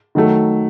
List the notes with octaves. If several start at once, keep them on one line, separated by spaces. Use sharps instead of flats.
D#3 F#3 A3